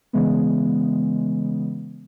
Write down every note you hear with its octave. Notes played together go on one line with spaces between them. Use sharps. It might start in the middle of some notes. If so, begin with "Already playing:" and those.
C#3 E3 G#3 B3